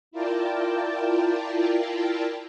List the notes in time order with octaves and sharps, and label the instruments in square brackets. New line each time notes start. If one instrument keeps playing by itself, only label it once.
[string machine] E4 F4 A#4 D5 G5 A5